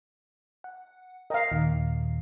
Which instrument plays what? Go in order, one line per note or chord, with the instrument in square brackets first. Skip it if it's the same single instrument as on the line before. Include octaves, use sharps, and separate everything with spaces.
[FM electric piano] F#5
[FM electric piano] A#4 G5 A#5 [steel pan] D#5 F5
[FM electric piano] D#2 A#2 D#3